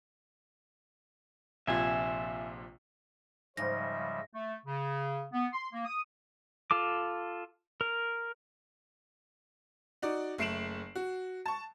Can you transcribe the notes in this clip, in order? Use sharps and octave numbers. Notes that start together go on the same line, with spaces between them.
A#1 C3 F4 E5 G#5
G#2 C#3 F3 G3 C5 D#5 E5 A#6
A3
C#3
B3
C6
A#3
D#6
F4 A4 D6
A#4
D#4 F#4 D5
F#1 A3 C7 D7 E7 F#7
F#4
A5 C#6